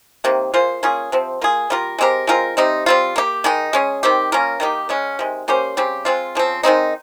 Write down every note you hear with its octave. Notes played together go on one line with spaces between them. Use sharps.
C3 D#3 A#3
A#3 F4 G#4 C5
A#3 C#4 F4 G#4
C3 F3 C4
A#3 F4 G#4
G3 A#3 F4 A#4
G#3 C4 G4 A#4
G#3 C4 F4 A#4
C3 G3 C4 D#4
G3 C4 F4
A#3 D#4 G4
D#3 G#3 D#4
G#3 C#4 G#4
D#3 G3 C4 G4
A#3 C#4 F4 A#4
D#3 A#3 D#4 G4
C#3 G#3 C#4
C3 D#3 G#3
A#3 C#4 G4 C5
C#3 G3 C4 G4
G#3 C4 F4
C#3 F3 C4
D#3 G#3 C4 D#4